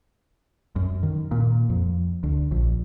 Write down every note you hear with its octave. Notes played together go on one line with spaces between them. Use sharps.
F#2
D#3
A#2
F2
D2
A#1